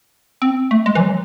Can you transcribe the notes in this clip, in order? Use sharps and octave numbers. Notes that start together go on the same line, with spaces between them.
C4
A3
G#3
E3
F#3